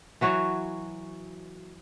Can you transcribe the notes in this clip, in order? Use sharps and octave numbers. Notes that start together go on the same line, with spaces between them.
E3 F#3 F#4 C#5